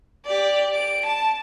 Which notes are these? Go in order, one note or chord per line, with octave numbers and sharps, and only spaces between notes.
G4 D5
D7
A5